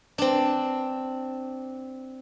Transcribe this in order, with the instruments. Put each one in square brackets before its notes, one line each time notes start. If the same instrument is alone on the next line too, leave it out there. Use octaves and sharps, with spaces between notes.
[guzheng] C4 D4